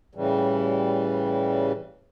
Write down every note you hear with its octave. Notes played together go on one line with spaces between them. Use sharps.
A2 C#3 E3 G3